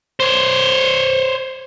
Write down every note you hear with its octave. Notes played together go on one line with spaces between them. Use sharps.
C5 C#5